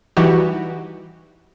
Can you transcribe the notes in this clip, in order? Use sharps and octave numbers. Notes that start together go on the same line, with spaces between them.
E3 G3 D#4 F#4 G4